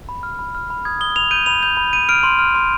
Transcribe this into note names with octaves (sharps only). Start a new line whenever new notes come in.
B5
F6
B5
F6
B5
D#6 G#6
D#6 G7
B5 F7
G6 D#7
B5 F7
G6 F7
B5
G6 D#7
F6 D7
C6
F6
C6